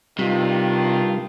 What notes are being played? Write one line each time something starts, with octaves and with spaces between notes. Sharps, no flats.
G2 C3 D#3 G3 F4